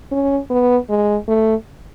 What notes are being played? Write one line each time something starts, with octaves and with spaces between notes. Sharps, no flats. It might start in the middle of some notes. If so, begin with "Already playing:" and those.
C#4
B3
G#3
A3